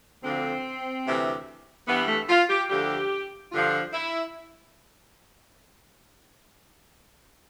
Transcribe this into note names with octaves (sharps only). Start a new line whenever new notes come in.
D2 D3 F3 C4
D2 C3 E3
G2 E3 B3
A3
F4
G4
D2 D3 F3 G4
G2 D3 F3 F4
E4